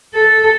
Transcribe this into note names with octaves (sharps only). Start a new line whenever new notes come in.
A4